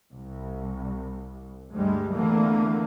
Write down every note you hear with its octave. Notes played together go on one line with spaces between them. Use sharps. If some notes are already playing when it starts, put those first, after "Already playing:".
C2
D2 G2 G3 G#3
E2 D3 E3 A3 A#3